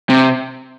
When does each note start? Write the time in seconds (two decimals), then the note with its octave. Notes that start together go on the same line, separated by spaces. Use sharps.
0.10 C3